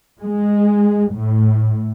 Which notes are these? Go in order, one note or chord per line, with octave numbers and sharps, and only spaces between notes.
G#3
A2